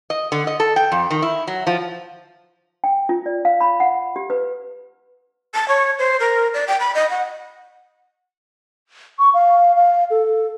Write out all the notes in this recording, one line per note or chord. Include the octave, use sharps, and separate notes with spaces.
D#5
D3
D#5
A4
G5
F2
D#3
E4
F#3
F3
G5
F4
D5
F5
B5
F#5
G4
B4
A5
C#5
C5
A#4
D5
G5
B5
D#5
F#5
C#6
F5
F5
A4